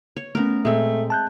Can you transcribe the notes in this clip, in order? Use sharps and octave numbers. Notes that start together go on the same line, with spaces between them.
C#5
A3 B3 C#4 A#4
A#2 G#3 A3 C4
A5 F#6 G6